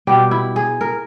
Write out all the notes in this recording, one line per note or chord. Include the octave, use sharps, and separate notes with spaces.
B2 G3 G4
E4
G#4
A#4